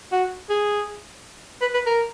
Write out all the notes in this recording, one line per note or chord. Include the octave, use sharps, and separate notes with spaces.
F#4
G#4
B4
B4
A#4